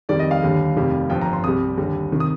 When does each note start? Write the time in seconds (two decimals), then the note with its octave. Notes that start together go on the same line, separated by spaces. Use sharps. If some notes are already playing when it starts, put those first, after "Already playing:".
0.09 F2 D#3 G3 D5
0.19 D#5
0.31 F5
0.43 D#2 D3 G3
0.76 F1 F2 C3 D#3 G3
1.10 G1 G2 F3 G5
1.21 A#5
1.33 C6
1.44 C2 C3 G3 D#6
1.77 D#2 D3 G3
2.12 C3 D#3
2.20 D#6